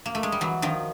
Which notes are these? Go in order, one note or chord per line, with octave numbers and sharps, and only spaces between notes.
A#3
A3
G#3
G3
E3 F#3
D#3 F3